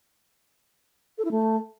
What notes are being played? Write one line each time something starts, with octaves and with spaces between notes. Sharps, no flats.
A4
E4
A3